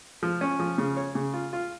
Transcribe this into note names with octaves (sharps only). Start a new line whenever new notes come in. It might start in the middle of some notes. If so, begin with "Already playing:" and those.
F3
C#4
F3
C#3
C#5
C#3
F4
F4